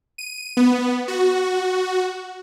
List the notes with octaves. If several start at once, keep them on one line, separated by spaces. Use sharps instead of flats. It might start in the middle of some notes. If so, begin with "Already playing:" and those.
D#7
B3
F#4